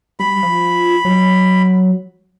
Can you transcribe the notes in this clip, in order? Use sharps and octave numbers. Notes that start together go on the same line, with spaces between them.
G3 B5
F3
F#3